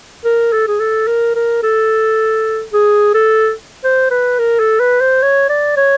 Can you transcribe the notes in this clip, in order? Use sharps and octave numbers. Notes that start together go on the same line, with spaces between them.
A#4
A4
G#4
A4
A#4
A#4
A4
G#4
A4
C5
B4
A#4
A4
B4
C5
C#5
D5
C#5